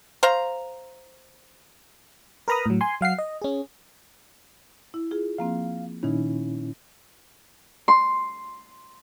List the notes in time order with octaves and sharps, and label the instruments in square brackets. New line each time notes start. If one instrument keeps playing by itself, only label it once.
[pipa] C5 F5 A#5
[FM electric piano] A#4 B4 A#5 B5 D#6
A2 F#3
G#5 C6
F#3 F5 F#5 C7
D#5
C#4 G#4
[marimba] E4
F4 G#4
[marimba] F3 A#3 C4 [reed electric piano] F5
[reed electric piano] A#2 C#4 E4 [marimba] D#3 D#4
[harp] C6